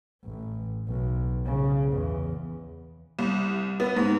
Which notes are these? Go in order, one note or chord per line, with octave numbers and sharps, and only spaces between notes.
A1
B1
C#3
E2
C2
B3
G#2